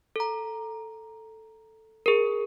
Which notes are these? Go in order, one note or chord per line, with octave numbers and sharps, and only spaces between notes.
A4 A#5
G#4 A#4